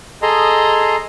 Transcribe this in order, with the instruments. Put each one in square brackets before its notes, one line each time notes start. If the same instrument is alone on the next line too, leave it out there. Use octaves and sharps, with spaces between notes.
[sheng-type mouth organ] G#4 A4 D#5 A#5 C6